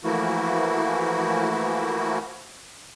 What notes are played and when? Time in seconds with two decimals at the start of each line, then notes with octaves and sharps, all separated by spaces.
0.04 E3 F3 A3 A#3 E4 F#4